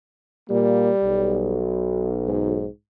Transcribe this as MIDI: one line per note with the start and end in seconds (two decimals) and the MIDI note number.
0.50 0.92 46
0.50 1.61 55
0.50 0.92 58
1.03 2.67 35
2.28 2.67 44